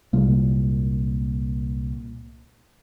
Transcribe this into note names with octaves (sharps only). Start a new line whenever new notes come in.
C2 A#2 G#3 A#3